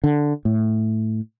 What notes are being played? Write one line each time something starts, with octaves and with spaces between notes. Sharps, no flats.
D3
A2